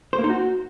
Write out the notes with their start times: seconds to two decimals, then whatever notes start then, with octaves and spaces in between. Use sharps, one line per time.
0.13 C5
0.19 A#3
0.24 D#4
0.30 F#4